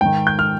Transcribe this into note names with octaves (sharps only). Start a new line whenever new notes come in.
G#2 D#3 G5
G6
F6